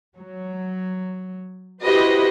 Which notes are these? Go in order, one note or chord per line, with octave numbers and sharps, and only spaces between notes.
F#3
E4 F#4 G4 B4 C5 D#5